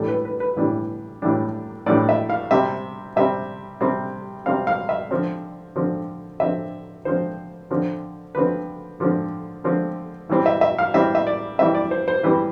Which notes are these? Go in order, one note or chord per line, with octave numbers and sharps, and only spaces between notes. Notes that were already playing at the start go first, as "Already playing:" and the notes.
Already playing: A2 E3 G3 D4 A4
B4
B4
B4
A2 E3 G3 D4
A2 E3 G3 D4
A2 E3 G3 D4 D5
E5
F5
C3 G3 C4 E5
C3 G3 C4 E5
C3 G3 C4
C3 G3 C4 F5
F5
E5
D3 F3 C4
D3 F3 C4
D3 F3 C4 E5
D3 F3 C4 C5
D3 F3 C4
D3 F3 C4 B4
D3 F3 C4
D3 F3 C4
E3 G3 C4
E5
E5
F5
E3 G3 C4 E5
E5
D5
E3 G3 C4 E5
D5
C5
C5
E3 G3 C4 B4